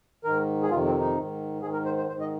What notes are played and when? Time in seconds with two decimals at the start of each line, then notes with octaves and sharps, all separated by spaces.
0.24 G#2 D#3 A#4
0.63 G#4
0.70 F2 C3 D#3 F4
0.86 C4
1.00 D#4
1.16 G#2 D#3
1.62 G#2 D#3 G#4
1.73 A#4
1.85 C5
1.97 C5
2.08 G#2 C5
2.12 D#3
2.20 D#5